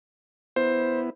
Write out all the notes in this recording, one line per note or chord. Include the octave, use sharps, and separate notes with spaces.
B3 E4 C5